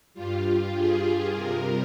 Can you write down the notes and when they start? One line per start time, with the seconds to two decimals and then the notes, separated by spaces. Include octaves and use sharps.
0.14 G2 G3 F4
0.75 G#4
1.35 C3 G3 A#4